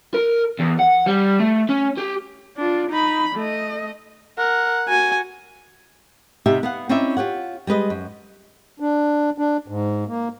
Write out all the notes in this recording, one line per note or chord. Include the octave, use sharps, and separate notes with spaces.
A#4
E2
F#5
G3
A3
C#4
G4
D4 F4
D#4 B5
A3 D#5
A#4 F#5
F#4 G#5
C3 B3 D#4 G4 E5
B3 F5 F#5
C4 C#4 D#4 E4 D5 E5
F4 G4 C#5 F#5
G3 G#3 B4 D#5
F#2
D4
D4
G#2
A#3